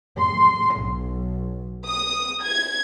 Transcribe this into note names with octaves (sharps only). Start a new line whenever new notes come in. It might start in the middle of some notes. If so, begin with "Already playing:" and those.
C6
B1
D#6
G#6